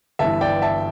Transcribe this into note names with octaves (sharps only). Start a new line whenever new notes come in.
G1 G2 E3 E5 A5
D5 G5
E5 A5